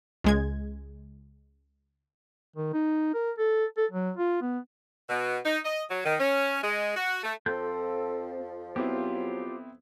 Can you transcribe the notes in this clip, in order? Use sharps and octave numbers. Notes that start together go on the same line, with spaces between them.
C#2 G#3 G#6
D#3
D#4
A#4
A4
A4
F#3
F4
B3
B2
D#4
D#5
F#3
D#3
C#4
G#3
F#4
A3
F2 F3 C4 A4 G6
F#3 B3 C4 E4 F4 G4